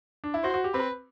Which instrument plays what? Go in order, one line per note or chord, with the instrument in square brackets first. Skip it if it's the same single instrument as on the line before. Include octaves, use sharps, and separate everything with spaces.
[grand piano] D4
E4
[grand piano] F#4 [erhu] C5
[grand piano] F#4
G4
[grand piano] C4 [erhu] B4